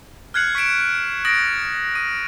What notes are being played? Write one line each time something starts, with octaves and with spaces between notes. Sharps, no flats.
F6 F#6 G#6 C7 C#7 F#7
C#6 B6 C#7 D7 E7
D#6 A6 A#6 D7 F#7
D#6 D#7